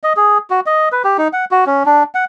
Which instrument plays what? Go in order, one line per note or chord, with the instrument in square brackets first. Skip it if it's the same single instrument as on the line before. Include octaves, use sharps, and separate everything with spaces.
[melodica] D#5
G#4
F#4
D#5
B4
G4
D#4
F#5
F#4
C#4
D4
F#5